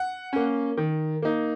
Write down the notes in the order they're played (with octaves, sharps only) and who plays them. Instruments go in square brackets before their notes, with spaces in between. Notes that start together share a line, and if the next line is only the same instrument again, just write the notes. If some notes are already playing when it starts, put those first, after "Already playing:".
Already playing: [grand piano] F#5
A#3 C#4
D#3
A#3 D#4